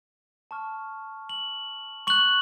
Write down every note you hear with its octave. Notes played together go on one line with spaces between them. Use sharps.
A5 C#6 F6
F#7
C#6 F#6 F#7